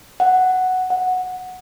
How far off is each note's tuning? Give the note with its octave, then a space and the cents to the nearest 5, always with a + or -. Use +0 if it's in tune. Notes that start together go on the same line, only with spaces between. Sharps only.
F#5 +0
F#5 -10